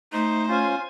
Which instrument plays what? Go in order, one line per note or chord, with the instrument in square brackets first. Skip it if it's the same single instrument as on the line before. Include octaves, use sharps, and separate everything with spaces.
[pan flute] A3 [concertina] D#4 [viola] C5
[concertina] C#4 F4 [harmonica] G#5